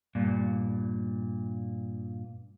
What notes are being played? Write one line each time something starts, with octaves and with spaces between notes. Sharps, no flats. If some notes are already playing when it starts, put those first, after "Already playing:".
G2 A#2